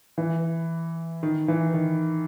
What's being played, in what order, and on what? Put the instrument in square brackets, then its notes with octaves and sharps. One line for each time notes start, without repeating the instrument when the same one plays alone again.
[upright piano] E3
D#3
E3
D#3